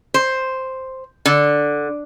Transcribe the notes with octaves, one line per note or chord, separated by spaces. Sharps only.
C5
D3